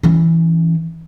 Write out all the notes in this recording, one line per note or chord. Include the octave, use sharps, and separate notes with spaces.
E3 C#4